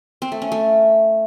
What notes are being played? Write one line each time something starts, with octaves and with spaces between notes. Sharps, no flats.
C4
A3
C#4
A3